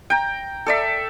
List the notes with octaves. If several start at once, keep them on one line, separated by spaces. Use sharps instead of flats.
G5 A#5
A4 D5 E5